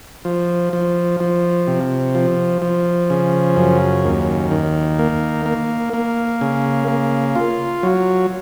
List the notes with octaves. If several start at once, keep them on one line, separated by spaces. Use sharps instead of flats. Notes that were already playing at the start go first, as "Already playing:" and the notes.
F3
F3
F3
C3
F3
F3
C#3
F#2
D#2
D#3
A#3
A#3
A#3
C#3
A#3
F4
F#3